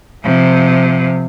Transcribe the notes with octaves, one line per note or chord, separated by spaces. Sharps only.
C3 F3